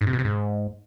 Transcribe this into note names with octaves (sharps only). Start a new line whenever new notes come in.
G#2
C3
B2
C3
G#2